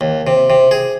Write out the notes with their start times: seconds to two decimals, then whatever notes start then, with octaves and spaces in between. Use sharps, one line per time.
0.01 D#2
0.27 C3
0.50 C3
0.71 G#4